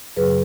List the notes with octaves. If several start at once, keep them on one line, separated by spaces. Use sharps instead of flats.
F#2 C#3 F#3 G#4 B4